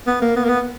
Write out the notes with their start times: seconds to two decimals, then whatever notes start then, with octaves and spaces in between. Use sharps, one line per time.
0.07 B3
0.21 A#3
0.36 B3
0.45 A#3
0.49 B3